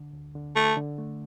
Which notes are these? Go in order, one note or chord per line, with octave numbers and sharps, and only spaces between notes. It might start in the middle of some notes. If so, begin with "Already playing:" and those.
Already playing: D3
D2
D3
D3 A3
D3
A3